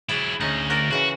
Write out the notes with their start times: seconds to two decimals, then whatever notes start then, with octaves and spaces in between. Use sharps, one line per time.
0.09 F#3 E4 G#4 D5
0.41 D2 C#4 D#4
0.70 F#4 A#4 D5
0.91 C#3 E3 F#4 F#5